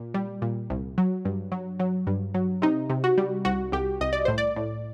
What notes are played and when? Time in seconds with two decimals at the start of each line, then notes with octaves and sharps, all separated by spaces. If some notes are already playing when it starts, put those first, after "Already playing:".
Already playing: A#2
0.14 G3
0.42 A#2
0.70 C2
0.98 F#3
1.25 G2
1.52 F#3
1.79 F#3
2.07 G2
2.34 F#3
2.62 C3 D#4
2.90 C3
3.04 F#4
3.18 G3
3.45 C2 F#4
3.72 C2 G4
4.01 C2 D#5
4.13 D5
4.25 A2 C5
4.38 D5
4.56 A2